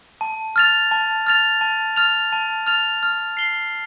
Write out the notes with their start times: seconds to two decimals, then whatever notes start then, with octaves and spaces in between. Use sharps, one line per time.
0.21 A5
0.56 F6 A6 F7
0.91 A5
1.27 F6 A6 F7
1.61 A5
1.96 F6 A6 F7
2.32 A5
2.67 F6 A6 F7
3.03 F6
3.37 C7 G7